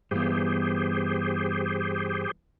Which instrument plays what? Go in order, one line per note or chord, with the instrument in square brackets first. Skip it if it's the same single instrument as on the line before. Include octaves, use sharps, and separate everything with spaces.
[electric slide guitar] G2 E3 B3 [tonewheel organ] G4 G#4 C5